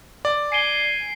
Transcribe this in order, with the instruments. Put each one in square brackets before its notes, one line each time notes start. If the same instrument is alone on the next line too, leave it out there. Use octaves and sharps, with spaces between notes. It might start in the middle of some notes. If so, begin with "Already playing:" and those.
[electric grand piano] D5
[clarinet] G#5 [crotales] C7 D7 G7